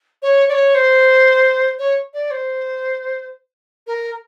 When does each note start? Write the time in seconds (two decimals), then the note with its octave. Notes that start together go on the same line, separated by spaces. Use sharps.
0.22 C#5
0.49 D5
0.52 C#5
0.75 C5
1.79 C#5
2.14 D5
2.31 C5
3.87 A#4